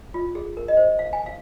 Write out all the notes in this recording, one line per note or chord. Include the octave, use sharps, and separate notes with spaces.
F4
G#4
A#4
D#5
C5
F5
G#5
F5